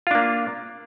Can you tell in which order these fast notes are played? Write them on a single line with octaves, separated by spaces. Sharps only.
F4 D4 A#3